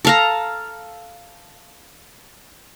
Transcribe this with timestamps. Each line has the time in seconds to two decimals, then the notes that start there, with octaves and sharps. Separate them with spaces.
0.05 A4 F5 A#5